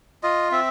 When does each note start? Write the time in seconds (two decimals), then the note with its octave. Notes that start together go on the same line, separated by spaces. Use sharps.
0.23 F4 D#5
0.51 C4 E5